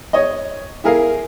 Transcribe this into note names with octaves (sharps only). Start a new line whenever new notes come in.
C#5 D#5
E4 G#4 A#4 F5